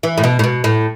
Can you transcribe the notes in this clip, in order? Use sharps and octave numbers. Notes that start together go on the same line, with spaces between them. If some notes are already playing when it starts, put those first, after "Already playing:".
E3
A2
B2
A2
B2
A2